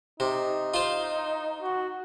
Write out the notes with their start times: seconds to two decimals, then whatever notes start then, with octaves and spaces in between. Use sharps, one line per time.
0.20 C3 D#4
0.74 F4 C5
1.62 F#4